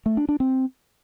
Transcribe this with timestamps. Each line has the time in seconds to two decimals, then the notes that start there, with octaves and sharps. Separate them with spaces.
0.06 A3
0.17 D4
0.29 D4
0.40 C4